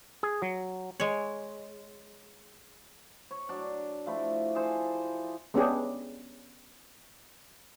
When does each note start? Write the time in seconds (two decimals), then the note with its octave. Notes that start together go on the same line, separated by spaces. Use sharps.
0.23 G#4
0.42 F#3
1.00 G#3 C#5
3.31 C#5
3.49 F#3 D4
4.06 F3 A3 E4
4.55 G#4 A4 C5
5.54 G#3 B3 C#4 D4 G4 G#4